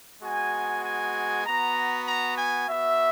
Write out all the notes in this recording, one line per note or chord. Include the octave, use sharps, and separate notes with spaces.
G#3 B3 F#4 G#5
G#5
B3 F#4 A#5
A#5
G#5
B3 F#4 E5